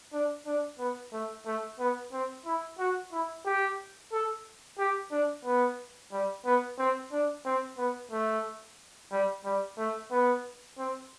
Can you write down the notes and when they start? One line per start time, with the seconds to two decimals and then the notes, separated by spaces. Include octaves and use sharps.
0.13 D4
0.46 D4
0.79 B3
1.13 A3
1.46 A3
1.79 B3
2.12 C4
2.46 E4
2.79 F#4
3.12 E4
3.46 G4
4.12 A4
4.79 G4
5.12 D4
5.45 B3
6.12 G3
6.45 B3
6.78 C4
7.12 D4
7.45 C4
7.78 B3
8.11 A3
9.11 G3
9.45 G3
9.78 A3
10.11 B3
10.78 C4